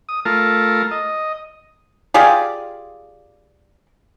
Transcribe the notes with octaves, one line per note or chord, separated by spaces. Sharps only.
D#6
A3 F4 A#4 A5
D#5
F4 G4 G#4 D5